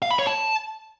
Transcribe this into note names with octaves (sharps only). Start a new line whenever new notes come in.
F5
B5
C#5
A5